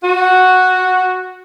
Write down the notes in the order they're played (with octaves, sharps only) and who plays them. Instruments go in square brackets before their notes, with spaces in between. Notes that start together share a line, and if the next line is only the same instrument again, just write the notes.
[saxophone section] F#4